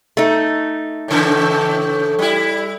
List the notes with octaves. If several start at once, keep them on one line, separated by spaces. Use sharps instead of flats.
A3 D#4
A2 C#3 E3
G3 E4